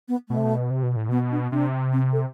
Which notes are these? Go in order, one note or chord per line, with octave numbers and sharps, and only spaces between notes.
B3
B2 A3
C3
B2
C3
B2
A2
B2 B3
D4
C3 D4
C4
A4